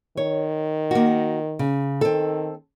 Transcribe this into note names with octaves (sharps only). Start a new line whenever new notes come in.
D#3 C#5
A#3 F#4
C#3
D#3 C4 A4